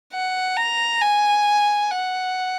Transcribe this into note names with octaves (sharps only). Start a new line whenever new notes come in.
F#5
A#5
G#5
F#5